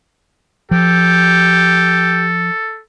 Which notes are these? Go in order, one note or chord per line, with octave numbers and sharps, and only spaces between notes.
F3 G4 A4